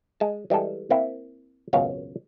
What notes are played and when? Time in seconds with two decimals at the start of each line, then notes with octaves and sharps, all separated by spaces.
0.20 G#3 A5
0.50 E3 G3 G#3 A4
0.90 A#3 C4 E4
1.73 G#1 C#2 F#2 B2 C#5 F5